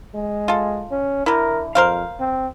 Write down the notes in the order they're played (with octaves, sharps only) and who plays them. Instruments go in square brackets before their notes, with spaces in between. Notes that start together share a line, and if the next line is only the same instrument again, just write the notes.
[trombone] G#3
[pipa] F4 A4
[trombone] C#4
[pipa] D3 E4 [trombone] A#4
[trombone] F2 [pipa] A#4 C5 F5
[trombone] C4